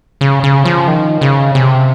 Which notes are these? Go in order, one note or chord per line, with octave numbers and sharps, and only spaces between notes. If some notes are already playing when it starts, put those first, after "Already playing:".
C#3
C#3
F3
D#3
C#3
C3